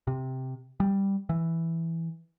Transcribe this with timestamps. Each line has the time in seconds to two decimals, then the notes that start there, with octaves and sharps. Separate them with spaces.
0.07 C3
0.80 G3
1.29 E3